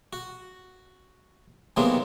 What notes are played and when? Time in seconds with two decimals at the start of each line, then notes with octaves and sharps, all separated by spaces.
0.13 F#4
1.77 C3 D#3 F#3 G#3 A#3 B3